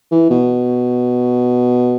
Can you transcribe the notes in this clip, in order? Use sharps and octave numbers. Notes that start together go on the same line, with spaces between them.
E3
B2